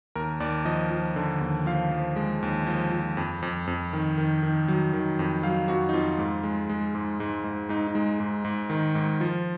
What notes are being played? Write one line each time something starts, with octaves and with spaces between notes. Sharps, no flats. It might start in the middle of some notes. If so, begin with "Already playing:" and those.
D#2 A#4
D#2 D5
F3 D#5
F3
D3
D#2
F3 F5
F3
G#3
D#2
F3
F3
F2
F2
F2
D#3
D#3
D#3
F#3
D#3
F2
F#3 F5
F2 F#4
D#4
F2 F4
G#2
G#3
G#3
G#2
G#2
G#2
G#2 D#4
D#4
G#3
G#2
G#2
D#3
G#2
F3 F4